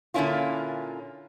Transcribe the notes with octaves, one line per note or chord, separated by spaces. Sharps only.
A#2 D3 A#3 C#4 E4 F4